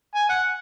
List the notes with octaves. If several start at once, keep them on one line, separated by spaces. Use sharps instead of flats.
G#5
F#5